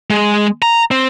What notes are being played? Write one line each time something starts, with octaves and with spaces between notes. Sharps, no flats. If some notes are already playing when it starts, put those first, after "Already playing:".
G#3
A#5
C4